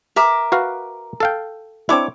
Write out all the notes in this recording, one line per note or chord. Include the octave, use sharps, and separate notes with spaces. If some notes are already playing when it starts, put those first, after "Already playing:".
A#4 E5 D6
F#4 B4 F5
A4 F5 G5
C4 D4 E4 C#5 D6